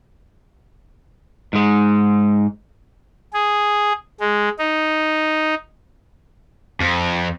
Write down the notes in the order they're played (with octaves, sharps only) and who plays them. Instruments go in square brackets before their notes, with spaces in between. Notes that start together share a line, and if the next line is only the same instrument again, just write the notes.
[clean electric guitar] G#2 G#3
[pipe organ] G#4
G#3
D#4
[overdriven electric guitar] F2